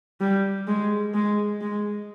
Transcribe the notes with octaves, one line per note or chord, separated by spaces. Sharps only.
G3
G#3
G#3
G#3